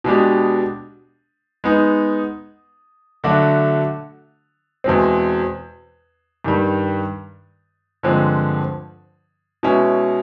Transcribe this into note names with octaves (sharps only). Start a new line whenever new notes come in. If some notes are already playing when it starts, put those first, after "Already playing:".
B2 G#3 B3 D4 G4
G#3 B3 D#4
D3 F#3 A3 D4 F#4
E2 B2 G#3 C4
G2 D#3 G3
G2 D3 F3 G#3 C4
B2 G#3 C#4 E4